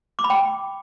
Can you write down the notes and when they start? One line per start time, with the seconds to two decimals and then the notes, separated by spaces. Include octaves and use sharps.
0.19 D6
0.24 B5
0.30 G5